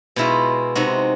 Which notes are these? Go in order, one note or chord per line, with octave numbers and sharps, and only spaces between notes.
B2 G#3 E4 F4
C3 G#3 D#4 F#4